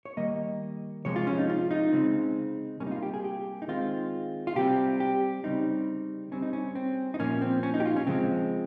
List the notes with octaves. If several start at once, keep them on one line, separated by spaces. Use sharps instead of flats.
C#5
D#3 G3 A#3 D#5
C3 F3 G#3 C#5
F4
C#4
D#4
F4
D#4
C#3 G#3 C4
C3 G3 A#3 C#4
D#4
F4
G4
G#4
G4
D#4
D#3 G#3 C4 F4
F4
C3 G3 C4 G4
G4
C#3 G3 C4 D#4
C#3 G3 C4 C#4
D#4
C#4
C4
D#4
A#2 F3 A#3 C#4
C4
C#4
D#4
G4
F4
C#4
C#3 F3 G#3 C4